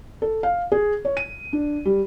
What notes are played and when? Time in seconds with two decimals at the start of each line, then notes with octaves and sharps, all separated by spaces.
0.22 A4
0.43 F5
0.72 G#4
1.05 C#5
1.17 D#7
1.53 D4
1.85 G3